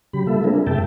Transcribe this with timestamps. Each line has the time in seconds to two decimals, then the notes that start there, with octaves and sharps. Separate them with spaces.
0.13 C#3 F#3 G4 B5
0.27 G3 A#3 F4 A4 E5
0.44 G#3 C4 D4 G#4 A#4
0.67 F#2 C3 E5 G5 A5